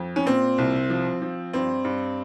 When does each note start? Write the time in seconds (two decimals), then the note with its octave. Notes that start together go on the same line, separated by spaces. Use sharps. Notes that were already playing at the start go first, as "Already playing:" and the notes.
Already playing: F2
0.16 C#4
0.26 A#2 C4
0.58 C2
0.90 F3
1.21 F3
1.53 G2 C4
1.85 G2